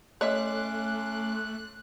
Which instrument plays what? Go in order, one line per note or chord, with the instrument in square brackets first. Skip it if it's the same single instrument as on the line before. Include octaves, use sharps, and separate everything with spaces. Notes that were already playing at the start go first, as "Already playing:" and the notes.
[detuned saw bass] A3 [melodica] C#4 C6 D6 [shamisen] C#5 D#5 E5 [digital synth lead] F#6